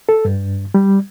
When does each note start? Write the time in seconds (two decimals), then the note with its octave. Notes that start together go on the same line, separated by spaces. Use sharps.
0.09 A4
0.25 G2
0.74 G3